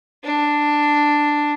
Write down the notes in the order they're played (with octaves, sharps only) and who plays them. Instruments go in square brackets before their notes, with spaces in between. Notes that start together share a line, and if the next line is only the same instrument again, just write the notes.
[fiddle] D4